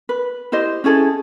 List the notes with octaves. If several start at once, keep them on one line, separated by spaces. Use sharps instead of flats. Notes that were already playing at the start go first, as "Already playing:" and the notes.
B4
E4 G4 C5 D#5
C#4 E4 G#4 A4